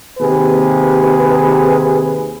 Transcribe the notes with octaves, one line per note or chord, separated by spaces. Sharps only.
D#2 C3 G#4 B4